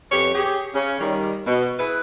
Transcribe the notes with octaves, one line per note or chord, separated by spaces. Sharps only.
F2 B3 G4 C#5
G4 G#4
C#3 C#4
D#3 G3
B2
E4 G#4 B4